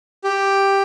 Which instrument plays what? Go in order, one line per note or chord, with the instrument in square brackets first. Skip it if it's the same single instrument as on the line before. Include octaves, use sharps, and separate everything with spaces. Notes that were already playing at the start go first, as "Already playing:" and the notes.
[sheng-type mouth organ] G4